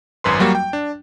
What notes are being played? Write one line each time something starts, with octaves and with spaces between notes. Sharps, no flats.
G#1 F#2 B4 C6
F#3 G3 A#3 F#4
G5
D4